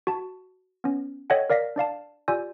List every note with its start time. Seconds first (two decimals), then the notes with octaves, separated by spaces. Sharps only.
0.07 F#4 A5
0.84 B3 C#4
1.30 A4 C#5 D#5 E5 F#5 G5
1.50 A#4 D5 F5 A#6 B6
1.76 D4 D5 F5 A5
2.28 F4 G4 D5 G#5 E6 G6